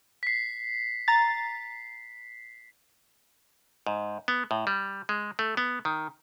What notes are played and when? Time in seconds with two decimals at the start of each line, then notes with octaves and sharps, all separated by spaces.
0.23 B6 C7
1.08 A#5 A6
3.87 G#2
4.28 B3
4.51 A2
4.67 G3
5.09 G#3
5.39 A3
5.57 B3
5.85 D#3